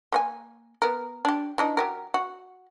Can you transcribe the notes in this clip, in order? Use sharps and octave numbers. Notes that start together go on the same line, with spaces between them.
A#3 C#5 G#5
B3 A#4
D4 G4
E3 D4 D#4
F#3 G4 A#4
F#4